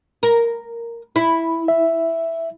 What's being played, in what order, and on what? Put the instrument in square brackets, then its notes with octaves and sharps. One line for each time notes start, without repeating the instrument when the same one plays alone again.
[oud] A#4
E4
[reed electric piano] E5